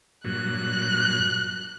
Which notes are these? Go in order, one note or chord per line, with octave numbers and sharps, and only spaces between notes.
G2 A#2 F#3 F#6